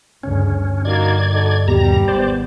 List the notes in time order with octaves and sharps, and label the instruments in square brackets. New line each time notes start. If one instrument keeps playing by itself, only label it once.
[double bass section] D2 G2 C#3 [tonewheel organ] C#4
[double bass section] G2 D3
[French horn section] A#3 D#4 F#4 [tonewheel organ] D5 G#6
[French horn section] D#4 F#4 A4
[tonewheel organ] D#2 B2 A#5 [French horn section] G3
[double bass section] G#1 D#2 B3 [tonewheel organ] C5 D5